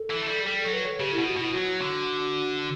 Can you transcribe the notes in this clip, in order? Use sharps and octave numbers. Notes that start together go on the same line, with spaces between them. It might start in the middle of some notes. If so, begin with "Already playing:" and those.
Already playing: A4
E3
A3
G3
G3 A4
F#3 A4
B4
A4
C#3 G4
B2 E4
F#4
B2 E4
F#3 F#4
D3